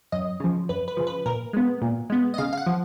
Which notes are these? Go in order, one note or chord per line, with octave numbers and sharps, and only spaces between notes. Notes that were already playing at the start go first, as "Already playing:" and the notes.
F#2 D#5
C#3 F3
F#2 B4
B4
C#3 F3
B4
A#2 A#4
G#3 B3
A#2
G#3 B3
D#5
C#3 F5
F5
F#5
F3